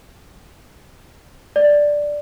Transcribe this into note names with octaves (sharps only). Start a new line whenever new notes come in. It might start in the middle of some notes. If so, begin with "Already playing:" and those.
D5